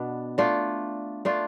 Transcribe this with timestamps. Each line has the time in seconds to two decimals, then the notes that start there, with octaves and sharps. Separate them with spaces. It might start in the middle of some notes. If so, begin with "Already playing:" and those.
Already playing: B2 B3 D4
0.38 A3 D4 F4
1.25 A3 D4 F4